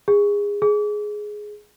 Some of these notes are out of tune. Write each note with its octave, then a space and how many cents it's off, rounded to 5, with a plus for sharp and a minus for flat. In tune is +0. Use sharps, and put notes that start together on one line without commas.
G#4 -25
G#4 +10